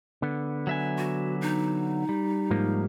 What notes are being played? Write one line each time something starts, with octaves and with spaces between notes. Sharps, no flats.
D3 B3
F#3 E5 G#5
F#4
D#4
G3
G#2 F3 A#3